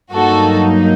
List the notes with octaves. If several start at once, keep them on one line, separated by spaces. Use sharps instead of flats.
G2 F#3 A#3 D#4 F#4 A4